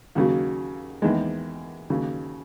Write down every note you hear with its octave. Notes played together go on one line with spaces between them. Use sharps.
D#2 C#3 F#3
E2 D#3 G#3
D#2 C#3 F#3